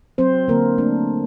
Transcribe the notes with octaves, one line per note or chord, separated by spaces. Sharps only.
F#3 C4 C5
D3 A#3 A#4
A3 D4